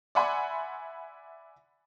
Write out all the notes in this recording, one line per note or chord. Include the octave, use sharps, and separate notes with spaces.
D5 E5 F#5 G#5 B5 C6